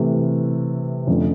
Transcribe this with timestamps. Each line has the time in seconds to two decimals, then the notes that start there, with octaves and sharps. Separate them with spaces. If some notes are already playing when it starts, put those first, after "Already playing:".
Already playing: C3 E3 A3
1.07 F2 D3 F3 A3 C#4